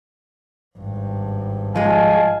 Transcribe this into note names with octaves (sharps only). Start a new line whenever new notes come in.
G#1 G2
F3 G#3 D#5 F5 G#5 A5